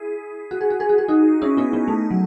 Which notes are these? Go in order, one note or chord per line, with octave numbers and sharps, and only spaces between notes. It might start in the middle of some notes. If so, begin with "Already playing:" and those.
Already playing: E4 G#4
F#4
G#4
F#4
G#4
F#4
G#4
D#4 F#4
C#4 E4
B3 D#4
B3
A3
F#3